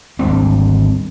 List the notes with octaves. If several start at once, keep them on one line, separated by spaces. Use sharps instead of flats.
G#1 D2 G3 C4